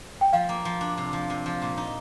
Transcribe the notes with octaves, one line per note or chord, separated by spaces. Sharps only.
G5
F3 F5
A#3
F3
D4
C3
F3
C3
F3
A#2
D#4